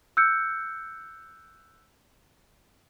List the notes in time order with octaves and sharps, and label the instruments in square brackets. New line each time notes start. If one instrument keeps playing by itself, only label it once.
[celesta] E6 F#6 G6 C#7